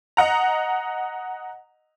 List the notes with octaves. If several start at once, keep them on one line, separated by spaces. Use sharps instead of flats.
D#5 F#5 A#5